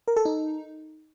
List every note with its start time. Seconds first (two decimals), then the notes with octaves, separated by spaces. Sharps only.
0.08 A#4
0.16 A4
0.25 D#4